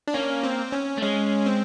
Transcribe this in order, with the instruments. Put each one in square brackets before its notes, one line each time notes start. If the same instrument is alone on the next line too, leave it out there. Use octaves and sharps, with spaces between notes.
[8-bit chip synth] D4
[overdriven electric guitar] A#3 [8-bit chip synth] C#4
[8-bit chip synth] C4
C#4
[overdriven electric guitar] A3
[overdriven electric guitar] G#3 [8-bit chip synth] C#4
[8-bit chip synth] C4